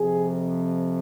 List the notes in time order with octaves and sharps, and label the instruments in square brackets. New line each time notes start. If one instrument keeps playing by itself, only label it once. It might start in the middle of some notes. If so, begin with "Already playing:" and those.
Already playing: [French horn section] F2 C3 F3 G#4